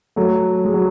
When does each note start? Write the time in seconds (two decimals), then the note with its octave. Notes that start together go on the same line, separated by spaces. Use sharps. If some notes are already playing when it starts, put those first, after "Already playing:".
0.16 F#3 A3
0.65 G#3
0.74 F#3